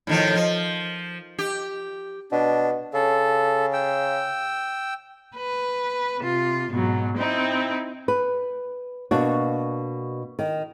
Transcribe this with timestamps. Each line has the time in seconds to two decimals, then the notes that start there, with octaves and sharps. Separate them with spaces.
0.07 A2 D#3 F3
0.35 F3
1.38 G4
2.32 B2 D4
2.94 C#3 A4
3.73 G5 E6
5.36 B4
6.20 C3 F4
6.71 G#2 B2 F#3
7.17 C4 D#4 E4
8.08 B4
9.11 B2 A#3 D4 F#4
10.39 D#3